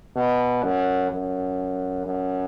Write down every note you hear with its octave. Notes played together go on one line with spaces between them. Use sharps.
B2
F#2
F#2
F#2